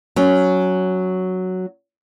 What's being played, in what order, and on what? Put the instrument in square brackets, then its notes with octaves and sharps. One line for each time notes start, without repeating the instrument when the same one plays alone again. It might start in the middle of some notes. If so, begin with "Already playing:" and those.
[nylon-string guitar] F#3 C#4